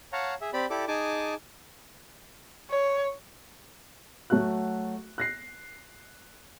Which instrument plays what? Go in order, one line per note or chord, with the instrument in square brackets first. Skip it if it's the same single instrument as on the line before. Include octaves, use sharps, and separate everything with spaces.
[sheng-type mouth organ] C#5 F5 F#5 A5 A#5
G#4 E5
C4 G4 D5 B5
E4 G4 A4 D5 D6
D#4 G#4 G#5 A5 D6
[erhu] C#5
[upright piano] F#3 A3 F#4 F#5 F#6
F#6 A#6 C7